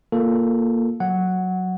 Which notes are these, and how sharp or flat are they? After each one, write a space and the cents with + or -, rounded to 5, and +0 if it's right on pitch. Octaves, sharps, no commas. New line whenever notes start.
A#3 +0 F4 +0 A4 +0
F#3 +0 F#5 +0